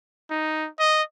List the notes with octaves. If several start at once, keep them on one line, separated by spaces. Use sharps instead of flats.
D#4
D#5